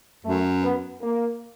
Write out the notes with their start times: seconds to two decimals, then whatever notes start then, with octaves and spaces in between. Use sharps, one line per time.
0.24 F#2 A3
0.62 B3
1.01 A#3